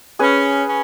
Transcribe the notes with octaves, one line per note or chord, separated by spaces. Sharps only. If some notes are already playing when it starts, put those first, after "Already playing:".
C#4 G#4 B4
C#4